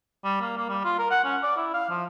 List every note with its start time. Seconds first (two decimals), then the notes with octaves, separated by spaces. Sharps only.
0.24 G3
0.42 A#3
0.57 A#3
0.69 G3
0.84 F4
0.99 A#4
1.11 F#5
1.24 C#4
1.43 D5
1.57 E4
1.74 F5
1.90 F3